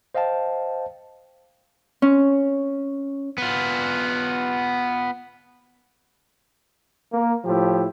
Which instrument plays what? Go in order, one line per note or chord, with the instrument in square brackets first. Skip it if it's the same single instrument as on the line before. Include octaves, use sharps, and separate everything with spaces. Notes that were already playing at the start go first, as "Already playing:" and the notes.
[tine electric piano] C5 D#5 F5 G5 A5
[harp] C#4
[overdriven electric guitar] B3 F4
[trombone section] A#3
A2 F3 E4 G4